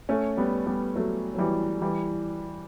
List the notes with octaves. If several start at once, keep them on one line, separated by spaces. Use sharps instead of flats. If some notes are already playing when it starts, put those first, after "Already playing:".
A3 C#4
G3 B3
G3 B3
F#3 A3
F#3
E3 G3
E3 G3